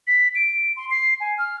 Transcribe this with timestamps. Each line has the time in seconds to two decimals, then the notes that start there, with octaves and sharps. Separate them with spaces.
0.07 B6
0.35 D7
0.77 C6
0.91 C7
1.20 G#5
1.38 F6